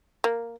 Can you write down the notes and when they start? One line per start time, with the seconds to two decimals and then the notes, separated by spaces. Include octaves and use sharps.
0.24 A#3